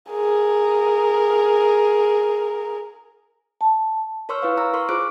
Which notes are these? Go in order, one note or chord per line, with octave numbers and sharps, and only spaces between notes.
G#4 A#4
A5
A#4 C#5 C6 C#6 E6 F6
E4 B4 F5
E4 A#5 E6
A#4 C6 C#6 F6
F4 G#4 C5 D6 F#6 D7